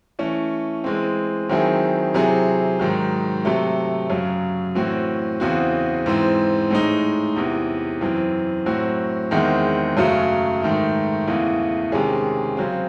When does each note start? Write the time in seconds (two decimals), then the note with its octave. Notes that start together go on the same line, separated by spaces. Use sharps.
0.19 E3 A3 C#4
0.84 E3 G#3 C4
1.49 D#3 F#3 C4 E4 G#4
2.14 C3 F#3 C4 E4 G#4
2.79 G#2 D#3 F#3
3.45 C3 F#3 A3
4.10 F#2 C#3 F#3
4.75 A2 E3 C4 F#4
5.40 E2 C#3 E3 C4 F#4
6.06 G#2 E3 C4
6.71 A2 G#3 D#4
7.36 E2 C3 E3
8.01 F#2 E3 C4
8.66 A2 F#3 C4 F#4
9.31 E2 D#3 G#3 C4 E4
9.97 F#2 C#3 F#3 A3
10.62 G#2 D#3 A3
11.27 E2 C#3 E3 A3
11.92 C3 D#3 G#3 C#4 G#4
12.57 C#3 F#3 C4